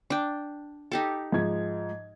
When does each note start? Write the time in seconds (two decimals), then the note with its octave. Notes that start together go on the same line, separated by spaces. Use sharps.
0.10 D4 G5
0.92 D#4 G4 A4
1.32 G#2 F3 G#6